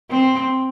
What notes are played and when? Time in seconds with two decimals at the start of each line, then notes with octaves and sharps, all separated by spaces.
0.11 C4